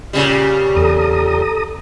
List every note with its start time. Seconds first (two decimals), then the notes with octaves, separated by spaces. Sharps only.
0.13 A#2 C#3 G3
0.76 E2 A4 A#5 D#6